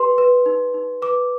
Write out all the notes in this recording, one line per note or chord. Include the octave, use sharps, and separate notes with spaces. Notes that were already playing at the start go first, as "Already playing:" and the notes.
Already playing: G4 B4 C6
B4
D#4
D#4
B4 D6